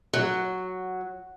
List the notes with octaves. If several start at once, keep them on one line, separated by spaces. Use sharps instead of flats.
F#3